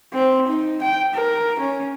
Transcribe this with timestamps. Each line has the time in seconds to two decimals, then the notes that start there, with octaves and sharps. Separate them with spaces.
0.13 C4
0.47 D#4
0.82 G5
1.14 A#4
1.60 C#4